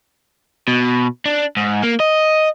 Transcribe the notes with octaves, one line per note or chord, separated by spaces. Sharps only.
B2
D4
G#2
A#3
D#5